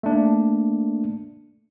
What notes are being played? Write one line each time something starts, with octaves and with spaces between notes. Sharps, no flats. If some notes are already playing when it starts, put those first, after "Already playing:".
A3 A#3 D4